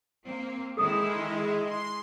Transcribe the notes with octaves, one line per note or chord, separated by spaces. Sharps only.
A#3 C4
D#3 G#3 E4 A4 D#6
C6